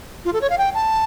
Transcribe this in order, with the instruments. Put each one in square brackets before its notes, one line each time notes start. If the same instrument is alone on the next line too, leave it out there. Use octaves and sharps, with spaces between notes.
[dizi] F4
A4
C#5
F5
G5
A5